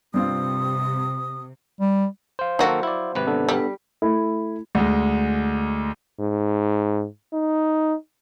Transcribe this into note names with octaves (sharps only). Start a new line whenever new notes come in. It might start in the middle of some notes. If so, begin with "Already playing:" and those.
G2 C3 C4 F4 D#6
G3
C5 F5
D#3 F#3 A#3 F#4 A4
E4 D5
G#1 C3 B4
B3 D4 A4
G3
A3 E4
D2 G#3
G#2
D#4